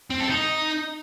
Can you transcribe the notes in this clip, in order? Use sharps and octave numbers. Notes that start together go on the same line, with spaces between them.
C4
A4
D#4